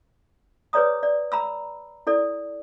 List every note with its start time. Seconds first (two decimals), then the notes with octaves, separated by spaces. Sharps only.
0.73 G#4 B4 C#5 D5 A#5 D#6
1.03 D5
1.32 A#5 B5 E6
2.07 E4 A4 D5